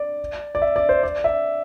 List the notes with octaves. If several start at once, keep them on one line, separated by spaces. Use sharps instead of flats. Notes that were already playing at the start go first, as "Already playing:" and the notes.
Already playing: D5
D5
E5
D5
C5
D5
E5